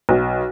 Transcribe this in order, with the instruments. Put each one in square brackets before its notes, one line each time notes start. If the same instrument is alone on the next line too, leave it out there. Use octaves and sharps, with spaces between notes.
[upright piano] B1